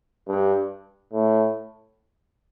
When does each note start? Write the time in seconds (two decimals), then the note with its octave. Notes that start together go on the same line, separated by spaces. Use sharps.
0.27 G2
1.13 A2